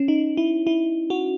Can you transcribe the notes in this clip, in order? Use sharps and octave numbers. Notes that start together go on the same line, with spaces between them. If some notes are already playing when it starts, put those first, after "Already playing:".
Already playing: C#4
D#4
E4
E4
F#4